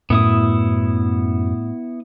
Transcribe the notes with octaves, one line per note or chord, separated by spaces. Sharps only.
F#2 A2 B3 E4 D#6